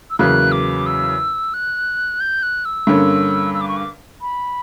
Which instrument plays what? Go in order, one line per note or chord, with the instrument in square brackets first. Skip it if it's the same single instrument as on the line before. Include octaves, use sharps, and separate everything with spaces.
[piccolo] E6
[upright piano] E2 C#3 F#3 A#3 [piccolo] F#6
[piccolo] D6
E6
F#6
G6
F#6
E6
[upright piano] G2 D3 A#3 C#4
[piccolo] E6
D6
C#6
D6
B5